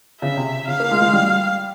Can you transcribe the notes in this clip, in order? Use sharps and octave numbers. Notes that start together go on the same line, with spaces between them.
C#3 E5
C3
C#3 F5
A#3
G#3
G#3
G3